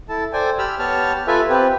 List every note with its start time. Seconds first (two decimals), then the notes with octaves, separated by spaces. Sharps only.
0.09 E4 A4 A5
0.33 A4 C5 D5 G5 G#5
0.58 G4 B5 E6 F6
0.79 B3 G4 C#5 A5 F6
1.27 F4 A4 B4 E5 G#5
1.50 C4 G4 B4